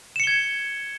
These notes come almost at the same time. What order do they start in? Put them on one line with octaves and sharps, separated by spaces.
E7 C#7 G7 G#6